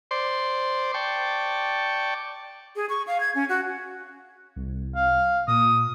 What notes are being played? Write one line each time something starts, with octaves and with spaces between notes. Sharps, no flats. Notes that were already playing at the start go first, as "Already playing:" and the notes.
C5 D5 C6
D5 G5 A5 C#6
G#4
C#6
F5
G#6
C#4
F#4
C2
F5
A#2 D#6